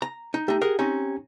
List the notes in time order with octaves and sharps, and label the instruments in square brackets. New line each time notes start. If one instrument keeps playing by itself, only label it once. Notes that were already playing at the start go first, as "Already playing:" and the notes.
[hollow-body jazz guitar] A#5
D#4
[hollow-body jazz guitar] A3 D#4 [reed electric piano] G4
[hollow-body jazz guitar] G#4 A#4 F#5
C4 C#4 D#4